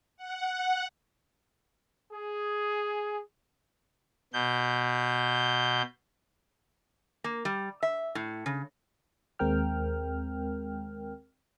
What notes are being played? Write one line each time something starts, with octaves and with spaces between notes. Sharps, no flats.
F#5
G#4
B2 G6
A#3
G3
E5
A2
C#3
D#2 G#3 C4 A#4 G5 F6